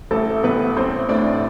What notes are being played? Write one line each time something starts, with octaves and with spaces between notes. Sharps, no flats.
A1 A3 A4
A1 B3 B4
A1 C4 C5
A2 D4 D5
D5